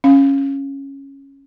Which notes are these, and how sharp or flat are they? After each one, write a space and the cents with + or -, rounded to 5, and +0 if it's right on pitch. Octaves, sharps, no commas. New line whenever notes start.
C#4 -10 F5 +0